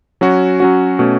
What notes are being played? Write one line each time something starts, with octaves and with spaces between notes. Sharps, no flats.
F#3 C#4 F#4
F#3 C#4 F#4
B2 A3 C#4